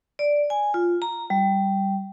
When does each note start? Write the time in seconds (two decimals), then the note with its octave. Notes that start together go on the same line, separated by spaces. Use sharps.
0.19 D5
0.50 G#5
0.74 F4
1.02 A#5
1.30 G3